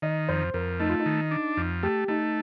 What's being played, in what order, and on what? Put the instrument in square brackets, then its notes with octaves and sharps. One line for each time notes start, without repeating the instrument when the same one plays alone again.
[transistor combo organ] D#3 [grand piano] D#5
[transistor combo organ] F2 [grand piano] C5
[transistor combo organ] F2 [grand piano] A#4
[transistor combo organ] A3 [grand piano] D#4
[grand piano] F4
D#4
[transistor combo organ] D#3
D4
F2
[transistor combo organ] A3 [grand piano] G4
[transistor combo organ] A3 [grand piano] D#4